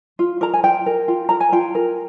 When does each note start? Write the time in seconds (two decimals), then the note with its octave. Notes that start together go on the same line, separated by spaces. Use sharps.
0.19 F4
0.41 A#4 A#5
0.54 G#5
0.63 F4 G5
0.86 A#4
1.08 F4
1.29 A#4 A#5
1.40 G#5
1.52 F4 G5
1.75 A#4